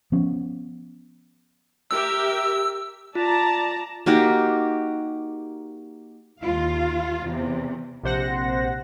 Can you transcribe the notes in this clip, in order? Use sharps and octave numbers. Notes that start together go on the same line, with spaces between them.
F3 B3 C#4
G4 A#4 E5 E6
F4 D5 A5 A#5
A#3 D#4 F#4 G4
D#2 F4 F5
E2 C3 E3
A#1 C3 C5 F#5 A#6